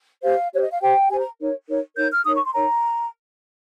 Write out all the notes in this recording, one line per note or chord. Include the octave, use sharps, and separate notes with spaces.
G4 C5 F5
G4 C5 C#5
D#5
F5
G4 C5 G5
G4 C5 G#5
A#5
D#4 A#4 C#5
D#4 A#4 C#5
D#4 A#4 C#5 G6
F6
D#4 A#4 C#5 D#6
C#6
C6
D#4 A#4 C#5 A#5